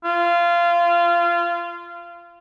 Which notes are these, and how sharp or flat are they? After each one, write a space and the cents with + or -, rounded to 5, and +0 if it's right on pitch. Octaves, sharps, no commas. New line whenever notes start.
F4 -20